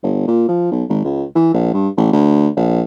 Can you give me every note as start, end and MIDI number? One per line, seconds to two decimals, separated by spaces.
0.03 0.24 31
0.28 0.44 46
0.48 0.67 53
0.71 0.84 35
0.89 1.00 32
1.04 1.24 37
1.35 1.51 52
1.54 1.71 34
1.73 1.88 43
1.97 2.09 33
2.13 2.48 38
2.56 2.82 34